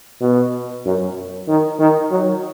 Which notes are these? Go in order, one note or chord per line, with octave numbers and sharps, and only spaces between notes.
B2
F#2
D#3
D#3
F#3